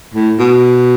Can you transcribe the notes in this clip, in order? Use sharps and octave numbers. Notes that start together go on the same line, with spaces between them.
A2
B2